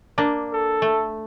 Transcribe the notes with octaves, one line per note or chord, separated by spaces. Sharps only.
A#3 D4
A4
A3